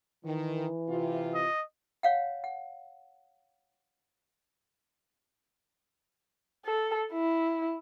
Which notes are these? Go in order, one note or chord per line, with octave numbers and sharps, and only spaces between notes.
D#3 E3
C3 F4
D#5
C#5 F5 F#5
F#5
A4
E4